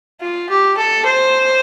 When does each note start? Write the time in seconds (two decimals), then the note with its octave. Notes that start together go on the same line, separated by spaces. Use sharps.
0.21 F4
0.50 G4
0.77 A4
1.06 C5